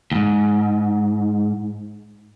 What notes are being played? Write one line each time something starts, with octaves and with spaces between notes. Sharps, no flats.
D#2 G#2